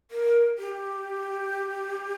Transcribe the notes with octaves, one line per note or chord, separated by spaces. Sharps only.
A#4
G4